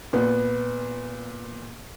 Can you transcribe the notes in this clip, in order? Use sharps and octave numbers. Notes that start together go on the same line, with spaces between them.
A#2 B3